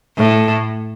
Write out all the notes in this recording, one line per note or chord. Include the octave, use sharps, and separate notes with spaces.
A2